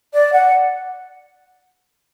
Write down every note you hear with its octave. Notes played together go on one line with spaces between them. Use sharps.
D5
F#5